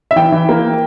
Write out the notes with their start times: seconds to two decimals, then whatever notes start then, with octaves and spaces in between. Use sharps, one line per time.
0.11 E5
0.16 E3 G5
0.32 E3
0.49 A#3